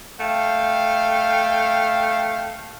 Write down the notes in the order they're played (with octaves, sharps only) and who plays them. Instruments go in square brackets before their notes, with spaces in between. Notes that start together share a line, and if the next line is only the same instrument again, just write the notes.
[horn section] A3 F5 G5